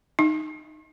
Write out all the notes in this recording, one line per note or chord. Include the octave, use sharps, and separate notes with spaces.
D#4